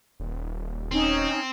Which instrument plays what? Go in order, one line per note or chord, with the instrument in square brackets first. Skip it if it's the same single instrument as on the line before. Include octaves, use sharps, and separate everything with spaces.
[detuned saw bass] D#1
[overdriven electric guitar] C4 [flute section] C#4 D#4